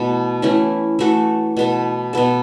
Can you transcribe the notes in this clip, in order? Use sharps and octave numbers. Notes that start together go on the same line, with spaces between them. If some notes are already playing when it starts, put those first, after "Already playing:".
Already playing: B2 E3 A3 B3 A4
E3 A3 C#4 E4
E3 A3 F#4 A4
B2 B3 A4
B2 B3 A4